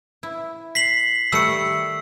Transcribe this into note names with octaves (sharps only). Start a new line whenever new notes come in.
E4
B6 C7 F#7
D#3 G3 A3 E6 C#7